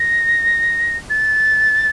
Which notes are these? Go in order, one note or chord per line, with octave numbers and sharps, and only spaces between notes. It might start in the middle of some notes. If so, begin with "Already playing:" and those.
Already playing: A#6
A6